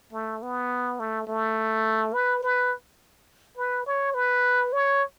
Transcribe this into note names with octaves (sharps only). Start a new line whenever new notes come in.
A3
B3
A3
A3
B4
B4
B4
C#5
B4
C#5